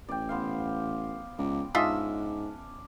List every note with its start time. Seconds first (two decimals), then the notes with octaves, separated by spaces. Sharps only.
0.09 A1 D5 G5
0.29 B3 C5 F5
1.38 C#2 D5
1.75 G#2 C#4 D4 F4 D#5 E5